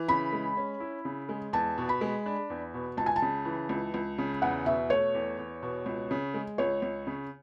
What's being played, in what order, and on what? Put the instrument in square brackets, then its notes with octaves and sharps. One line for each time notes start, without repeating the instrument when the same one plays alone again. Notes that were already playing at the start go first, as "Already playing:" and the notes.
Already playing: [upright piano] E3
[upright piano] C#3 [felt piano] B5
[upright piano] G#3
C#4
E4
C#3
G#3
[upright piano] E2 [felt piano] A5
[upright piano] B2
[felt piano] B5
[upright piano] G#3
D4
E2
B2
[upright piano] C#2 [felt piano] A5
[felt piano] G#5
A5
[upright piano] C#3
E3
C#2
C#2
C#3
[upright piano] E2 [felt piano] F#5
[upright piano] B2 [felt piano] E5
[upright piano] A3 [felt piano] C#5
[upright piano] E2
E2
B2
C#2
C#3
G#3
[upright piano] C#2 [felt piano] C#5
[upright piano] C#2
C#3